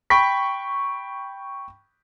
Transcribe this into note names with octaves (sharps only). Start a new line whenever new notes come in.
G5 B5 C#6 B6